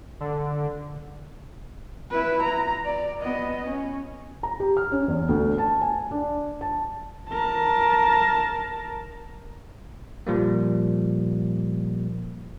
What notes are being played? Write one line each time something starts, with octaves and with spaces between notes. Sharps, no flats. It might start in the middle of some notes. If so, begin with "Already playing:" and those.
D3
E4 B4
A#5
D5
B3 D#5
C#4
A#5
G4
F6
C#4
E2
D2
A5
G#5
D4
A5
A#4 A5
A#2 F3 G3 A#3